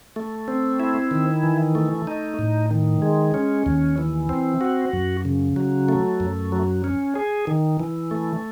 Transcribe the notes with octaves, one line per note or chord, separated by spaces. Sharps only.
A3
C4
E4
D#3
E3
A3
D#4
A2
D#3
G#3
C#4
D#2
E3
C4
F#4
F#2
C#3
F#3
A3
F#2
F#3
C#4
G#4
D#3
E3
A3